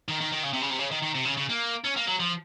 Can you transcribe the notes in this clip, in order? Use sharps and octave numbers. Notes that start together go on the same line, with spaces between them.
D#3
D#3
D#3
C#3
C3
C#3
C3
C#3
D#3
D#3
C3
C#3
C#3
A#3
C#4
A#3
F#3
F3